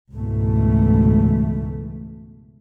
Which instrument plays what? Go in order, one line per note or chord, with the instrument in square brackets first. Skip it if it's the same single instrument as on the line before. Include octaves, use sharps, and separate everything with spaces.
[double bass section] C#2 G#2 B2 E3 A3